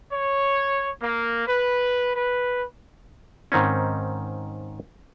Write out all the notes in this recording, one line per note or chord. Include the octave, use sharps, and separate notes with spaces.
C#5
A#3
B4
B4
G#2 D#3 C4 C#4